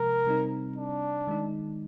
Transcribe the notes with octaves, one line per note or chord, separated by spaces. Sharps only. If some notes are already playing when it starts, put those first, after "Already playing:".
Already playing: C3 F3 G#3 A#4
C3 G3 C4 D#4
D4
D#3 G#3 D#4